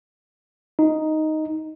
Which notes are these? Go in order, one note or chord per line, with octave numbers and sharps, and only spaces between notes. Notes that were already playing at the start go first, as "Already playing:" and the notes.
D#4